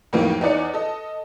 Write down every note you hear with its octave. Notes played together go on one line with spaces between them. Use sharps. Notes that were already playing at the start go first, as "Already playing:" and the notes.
F2 A2 D#3 E3 F#3 A#3
E2 D#4 C#5 D5 F#6 C#7
A4 D#5